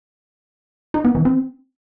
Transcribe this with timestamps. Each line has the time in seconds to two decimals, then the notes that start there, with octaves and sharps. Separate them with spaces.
0.94 D#4
1.05 B3
1.15 E3
1.25 C4